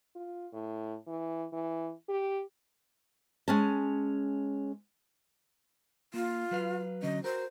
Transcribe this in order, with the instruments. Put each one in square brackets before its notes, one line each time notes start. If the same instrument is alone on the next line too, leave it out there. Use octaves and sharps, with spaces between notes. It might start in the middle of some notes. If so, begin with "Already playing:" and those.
[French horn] F4
A2
E3
E3
G4
[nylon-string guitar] G#3 C#4 A5
[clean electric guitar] A#3 [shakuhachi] F4
[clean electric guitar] F#3 B4 F5
[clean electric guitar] D3 F#3 C#4 [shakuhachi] D#5
[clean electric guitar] F#4 A#4 [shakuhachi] C5